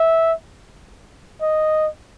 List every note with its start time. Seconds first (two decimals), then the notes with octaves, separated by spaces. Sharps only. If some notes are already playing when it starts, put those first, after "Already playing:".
Already playing: E5
1.41 D#5